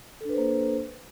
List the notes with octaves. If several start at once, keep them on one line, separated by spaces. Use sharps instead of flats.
A#3 D4 A4 B4 C5